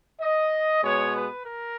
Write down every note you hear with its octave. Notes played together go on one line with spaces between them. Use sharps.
D#5
B2 G#3 B3 C#5
B4
A#4